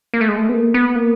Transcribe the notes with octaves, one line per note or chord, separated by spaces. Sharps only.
A#3
A3
G#3
A3
B3
A#3
B3
A#3